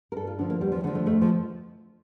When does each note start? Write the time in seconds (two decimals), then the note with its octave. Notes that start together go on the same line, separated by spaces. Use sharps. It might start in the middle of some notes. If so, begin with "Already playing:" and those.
0.12 A#4
0.16 G2 A4
0.27 F4
0.38 D3 F3 D4
0.50 A#3
0.61 E2 G3
0.72 F3
0.84 D3 A3
0.87 F3
0.95 A3
1.06 F2 A3
1.21 F3